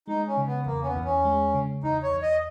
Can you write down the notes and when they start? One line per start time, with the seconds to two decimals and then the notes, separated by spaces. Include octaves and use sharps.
0.08 G#3 D#4
0.27 C#4
0.37 C#3
0.47 B3
0.66 E2 A#3
0.82 C#4
0.86 B3
0.96 E2
1.05 C#4
1.25 G#3
1.54 C#3
1.83 E2 D#4
2.03 C#5
2.12 E2
2.22 D#5